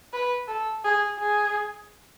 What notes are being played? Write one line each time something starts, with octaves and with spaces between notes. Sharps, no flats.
B4
A4
G#4
G#4